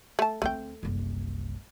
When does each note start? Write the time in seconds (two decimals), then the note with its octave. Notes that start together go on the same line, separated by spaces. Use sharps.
0.19 A3 A5
0.42 D2 A3 C4 G5
0.83 F#1 C2